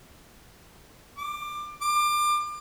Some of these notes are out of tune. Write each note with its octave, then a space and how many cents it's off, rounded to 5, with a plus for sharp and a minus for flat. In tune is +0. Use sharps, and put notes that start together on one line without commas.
D6 +20
D6 +30